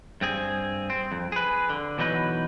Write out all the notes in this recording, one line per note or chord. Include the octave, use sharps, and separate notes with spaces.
G2 C4 G#4
C4
F2
G#4 B4
D3
B2 E3 F#3 D#4 B4